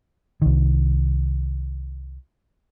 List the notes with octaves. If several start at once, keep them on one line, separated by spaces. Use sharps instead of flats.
C2 D#3